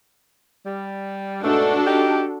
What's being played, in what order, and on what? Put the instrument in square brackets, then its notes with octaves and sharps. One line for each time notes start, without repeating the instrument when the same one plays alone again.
[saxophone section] G3
[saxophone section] G#2 B2 A3 [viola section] D4 F#4 A4
[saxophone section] D#4 G4